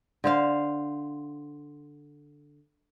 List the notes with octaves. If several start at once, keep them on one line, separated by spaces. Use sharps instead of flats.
D3 C5 F5